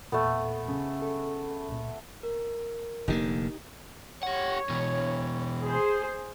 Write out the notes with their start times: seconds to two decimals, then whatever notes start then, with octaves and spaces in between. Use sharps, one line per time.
0.12 E2 A#2 A3 B3 A4
0.68 C#3
1.02 A4
1.69 C#2 A#2
2.23 A#4
3.08 F1 D3 A#3 D#4 G4
4.23 G4 C#5 F#5
4.70 B2 E3
5.63 G#4 C5